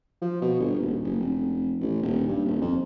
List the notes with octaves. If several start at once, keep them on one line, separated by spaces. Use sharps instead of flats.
F3
B2
G1
D#1
F#1
F1
A1
D#1
G2
D#1
F2